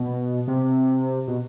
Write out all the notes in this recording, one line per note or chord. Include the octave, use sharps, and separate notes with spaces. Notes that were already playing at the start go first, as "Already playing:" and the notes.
Already playing: B2
C3
B2